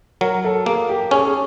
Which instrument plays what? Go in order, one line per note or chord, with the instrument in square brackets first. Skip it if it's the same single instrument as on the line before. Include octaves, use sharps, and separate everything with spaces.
[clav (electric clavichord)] F#3 [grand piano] A#4
[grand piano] A4
[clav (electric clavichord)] A#3 [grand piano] G#4
[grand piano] G4
[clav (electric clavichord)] C#4 [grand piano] G#4
[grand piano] A4
G#4